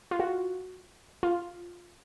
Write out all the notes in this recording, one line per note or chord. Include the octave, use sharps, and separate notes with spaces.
F4
F#4
F4